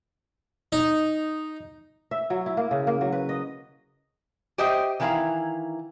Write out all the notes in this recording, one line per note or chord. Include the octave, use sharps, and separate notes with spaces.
D#4
E5
F#3
E4
A#3
C#3
A#3
F#3
B4
D#5
G4 C5 D#5 E5 G5
D#3 E3 E4 A#4 F5 A#5